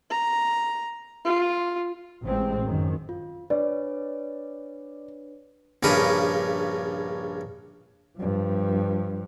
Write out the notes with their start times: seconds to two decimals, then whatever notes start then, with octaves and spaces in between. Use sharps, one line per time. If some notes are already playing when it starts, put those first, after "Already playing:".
0.11 A#5
1.25 F4
2.23 A1 C3 G#3 C4
2.63 F#2 D#3
3.09 F4
3.50 D4 B4 C#5 D5
5.83 A#1 G2 C#3 A#4 B5 D#6
8.18 G2 F3